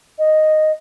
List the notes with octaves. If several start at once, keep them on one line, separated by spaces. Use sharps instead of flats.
D#5